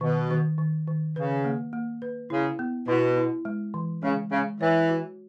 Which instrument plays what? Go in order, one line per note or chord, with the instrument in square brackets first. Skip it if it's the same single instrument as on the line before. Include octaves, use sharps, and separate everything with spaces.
[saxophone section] B2 [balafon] D#3
[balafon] D#3
D#3
D#3
[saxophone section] C#3 [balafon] B4
[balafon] A#3
A#3
B4
[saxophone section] C#3 [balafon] E4
[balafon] B3
[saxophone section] B2 [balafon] E4
[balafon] E4
G#3
E3
[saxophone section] C#3 [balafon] G#3
[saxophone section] C#3 [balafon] G#3
[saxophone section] E3 [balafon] C#5
[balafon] F#4